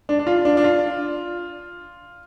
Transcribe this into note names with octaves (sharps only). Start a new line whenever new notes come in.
D4
D4
F4
D4
D4
F4